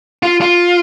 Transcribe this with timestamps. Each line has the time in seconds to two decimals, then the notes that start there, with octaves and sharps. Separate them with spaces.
0.23 F4
0.41 F4